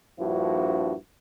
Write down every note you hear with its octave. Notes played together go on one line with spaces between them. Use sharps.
A#1 G2 F3 E4 F#4